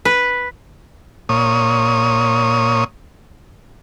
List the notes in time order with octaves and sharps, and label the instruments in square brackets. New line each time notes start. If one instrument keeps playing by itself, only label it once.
[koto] B4
[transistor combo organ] A#2 C#5 D#6